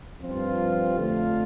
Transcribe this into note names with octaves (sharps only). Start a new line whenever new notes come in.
G2 F3 C4 F4
F2 D3 A3 F4